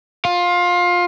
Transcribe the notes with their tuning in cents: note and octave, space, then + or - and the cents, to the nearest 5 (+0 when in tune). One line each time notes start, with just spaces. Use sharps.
F4 +20